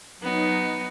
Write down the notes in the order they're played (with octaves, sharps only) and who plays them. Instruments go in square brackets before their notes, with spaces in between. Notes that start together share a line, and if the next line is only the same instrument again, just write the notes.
[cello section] F#3 D#4 [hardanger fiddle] B3